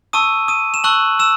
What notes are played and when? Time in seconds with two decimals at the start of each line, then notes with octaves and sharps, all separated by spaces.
0.13 A5 C#6 D#6 E6 D#7
0.48 D#6 D#7
0.74 E7
0.84 A5 C#6 E6 F#6 F#7
1.19 E6 E7